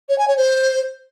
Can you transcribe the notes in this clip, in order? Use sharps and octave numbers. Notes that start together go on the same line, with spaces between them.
C#5
G#5
C#5
C5